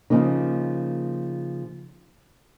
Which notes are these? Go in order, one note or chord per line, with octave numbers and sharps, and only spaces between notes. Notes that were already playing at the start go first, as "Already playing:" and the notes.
C#3 F3 A#3 D#4